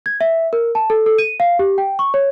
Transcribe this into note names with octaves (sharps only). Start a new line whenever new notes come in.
G#6
E5
A#4
A5
A4
A4
D#7
F5
G4
G5
C#6
C#5